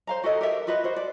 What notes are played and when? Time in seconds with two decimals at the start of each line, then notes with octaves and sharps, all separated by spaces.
0.07 C5 F5 A#5
0.24 F#4 G4 A4 D#5
0.41 G4 A#4 E5
0.67 F4 F#4 B4 D#5
0.84 F#4 C5
0.96 D5